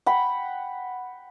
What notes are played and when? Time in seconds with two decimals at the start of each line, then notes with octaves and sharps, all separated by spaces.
0.06 F#5 G5 B5